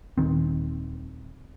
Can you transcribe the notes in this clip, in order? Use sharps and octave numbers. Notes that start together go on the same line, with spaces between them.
D#1 B1 D#3 C4